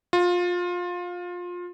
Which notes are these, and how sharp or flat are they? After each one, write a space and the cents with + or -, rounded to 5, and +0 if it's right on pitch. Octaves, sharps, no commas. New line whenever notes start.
F4 +20